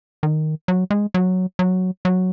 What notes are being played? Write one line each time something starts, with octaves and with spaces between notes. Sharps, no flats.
D#3
F#3
G#3
F#3
F#3
F#3